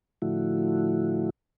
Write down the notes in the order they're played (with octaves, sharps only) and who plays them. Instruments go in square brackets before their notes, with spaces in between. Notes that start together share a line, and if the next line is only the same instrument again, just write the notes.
[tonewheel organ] A2 D3 F3 A3 E4 F#4